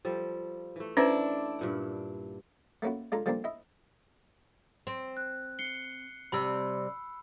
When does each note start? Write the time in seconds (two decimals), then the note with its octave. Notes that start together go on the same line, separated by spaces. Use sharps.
0.05 F3 G3 A4
0.76 E3 A3
0.97 C#4 D4 E4 B4 C5
1.59 G2 A#2 F#5
2.82 A3 A#3 C#4 E4 F#4
3.12 G#3 D4 F4 A4 A#5
3.26 D3 F3 G3 A#3 C4 D4
3.44 E4 D#5 E5
4.87 C4
5.17 F#6
5.59 C7 C#7 G7
6.32 C3 G3 B5 E6